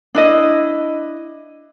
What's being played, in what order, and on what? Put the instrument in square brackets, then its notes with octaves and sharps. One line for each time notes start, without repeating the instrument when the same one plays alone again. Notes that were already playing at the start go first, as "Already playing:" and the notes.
[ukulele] D4 E4 D#5